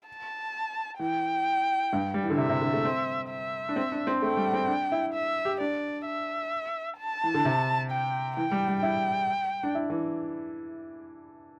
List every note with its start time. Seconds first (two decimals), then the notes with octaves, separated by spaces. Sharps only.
0.08 A5
0.99 E3 G5
1.93 G2
2.14 G3
2.23 E3
2.30 D3
2.38 C3 E5
2.49 C3
2.61 D3
2.73 A3
2.85 C4
3.30 E5
3.69 D4
3.76 C4
3.92 D4
4.07 C4
4.22 A3 G5
4.37 G3
4.53 C4
4.68 D4
4.92 E4
5.14 E5
5.45 G4
5.60 D4 D5
6.06 E5
6.99 A5
7.24 E3
7.34 D3
7.45 C3
7.91 G5
8.36 E3 G5
8.51 G3
8.68 G3
8.83 E4 G5
9.63 D4
9.75 E4
9.90 E3